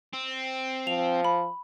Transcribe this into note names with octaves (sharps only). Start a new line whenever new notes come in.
C4
F3 F7
B5